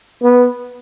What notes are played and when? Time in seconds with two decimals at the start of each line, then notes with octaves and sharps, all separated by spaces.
0.22 B3